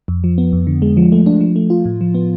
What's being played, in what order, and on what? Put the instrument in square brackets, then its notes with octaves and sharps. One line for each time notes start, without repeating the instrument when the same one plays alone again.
[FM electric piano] F2
F3
B3
F2
D3
G#3
F3
A3
D4
F3
A3
F4
A2
F3
B3